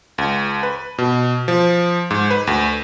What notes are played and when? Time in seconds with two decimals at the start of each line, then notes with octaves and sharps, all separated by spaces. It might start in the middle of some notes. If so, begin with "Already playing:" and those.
0.18 C#2
0.63 B4
0.98 B2
1.48 F3
2.11 G#2
2.31 B4
2.47 D2